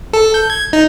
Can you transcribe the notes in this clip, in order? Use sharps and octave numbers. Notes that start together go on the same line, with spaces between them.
A4
G6
G#6
D#4